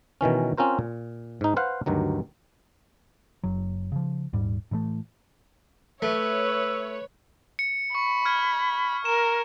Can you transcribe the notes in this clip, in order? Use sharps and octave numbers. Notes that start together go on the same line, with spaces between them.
B2 D#3 E3 C#4
C4 C#4 F4 A#4 C5
A#2
G#2 D#4
B4 C5 F5 F#5
D2 G2 D#3 F#3
F#1 F#3
C#3 F3
D#1 G#2 G3
A2 E3 F#3 A3
A3 B4 C#5 E5
C#7
B5 C#6
F6 G#6
A#4 E7